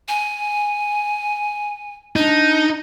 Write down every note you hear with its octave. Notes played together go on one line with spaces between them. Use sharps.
G#5
D4 D#4